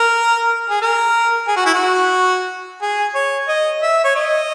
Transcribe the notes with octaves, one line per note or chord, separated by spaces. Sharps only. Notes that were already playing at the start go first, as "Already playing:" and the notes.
Already playing: A#4
G#4
A#4
G#4
F#4
E4
F#4
G#4
C#5
D#5
E5
C#5
D#5